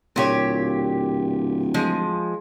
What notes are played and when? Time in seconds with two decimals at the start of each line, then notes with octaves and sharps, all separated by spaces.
0.16 D1 A#2 G4 C#5
1.74 F3 G#3